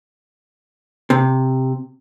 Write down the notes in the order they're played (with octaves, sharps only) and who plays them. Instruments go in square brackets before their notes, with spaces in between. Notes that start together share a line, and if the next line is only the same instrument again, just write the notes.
[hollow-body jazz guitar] C3